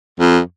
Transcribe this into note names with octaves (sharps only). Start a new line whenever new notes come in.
F2